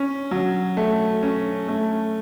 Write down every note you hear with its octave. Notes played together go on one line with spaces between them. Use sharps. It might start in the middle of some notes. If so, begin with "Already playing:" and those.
Already playing: C#4
F#3
A3
C#4
A3